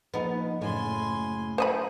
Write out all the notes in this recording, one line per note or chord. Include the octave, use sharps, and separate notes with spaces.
F3 A#3 B3 D#4
F#1 A2 G#5 C6
C5 D#5 B5